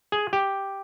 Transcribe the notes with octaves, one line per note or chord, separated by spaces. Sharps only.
G#4
G4